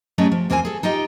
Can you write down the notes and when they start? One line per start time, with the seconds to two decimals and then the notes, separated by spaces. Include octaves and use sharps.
0.18 F#3 G3 A3 C#4 G#4 D#5
0.32 F3
0.50 E2 A#3 C4 F4 G#5
0.65 G#4 A4
0.83 D#4 F4 G4 D#5 G5